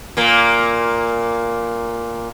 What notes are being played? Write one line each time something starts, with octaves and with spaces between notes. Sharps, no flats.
A#2 A#3